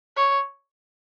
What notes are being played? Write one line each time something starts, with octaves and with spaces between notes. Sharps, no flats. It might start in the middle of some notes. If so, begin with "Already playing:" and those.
C#5